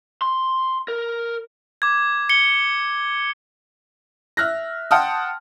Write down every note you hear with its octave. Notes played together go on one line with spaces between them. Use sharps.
C6
A#4
D6 G#6
C#7 G7
E5 F6 F#6 A#6
F#5 G5 A5 C6 D#6 F6